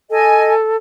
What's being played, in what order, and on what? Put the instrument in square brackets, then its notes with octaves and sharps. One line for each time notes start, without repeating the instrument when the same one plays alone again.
[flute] A4 [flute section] D#5 G#5